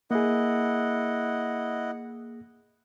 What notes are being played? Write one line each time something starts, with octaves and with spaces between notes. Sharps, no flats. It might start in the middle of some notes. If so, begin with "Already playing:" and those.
A#3 E4 G#4 D#5 F#5